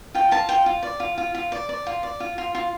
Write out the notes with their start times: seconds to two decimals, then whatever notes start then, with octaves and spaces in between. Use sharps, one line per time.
0.15 F4 G5
0.31 F4 A5
0.49 F4 G5
0.66 F4
0.83 D5
1.00 F4
1.18 F4
1.35 F4
1.52 D5
1.69 D5
1.87 F4
2.03 D5
2.20 F4
2.38 F4
2.55 F4